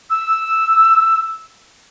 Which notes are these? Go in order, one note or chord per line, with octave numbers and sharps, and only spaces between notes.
E6